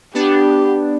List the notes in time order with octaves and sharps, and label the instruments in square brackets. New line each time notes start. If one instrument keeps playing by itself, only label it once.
[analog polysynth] B3 D4 [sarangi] G4